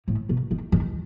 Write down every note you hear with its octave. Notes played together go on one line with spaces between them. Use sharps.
A2
B2
D#3
D#3